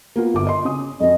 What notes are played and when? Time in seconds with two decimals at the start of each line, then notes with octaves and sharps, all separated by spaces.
0.16 A#3 B3 F4
0.34 G1 D6
0.47 D#5 C6
0.65 C#3 C#4 D#6
1.00 F2 C#4 D#5